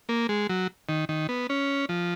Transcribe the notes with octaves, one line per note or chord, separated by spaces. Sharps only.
A#3
G#3
F#3
D#3
D#3
B3
C#4
F3